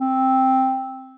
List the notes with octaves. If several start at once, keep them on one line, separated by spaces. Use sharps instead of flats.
C4